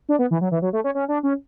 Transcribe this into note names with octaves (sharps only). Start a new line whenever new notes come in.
D4
B3
E3
F#3
E3
F#3
A3
C#4
C#4
D4
C#4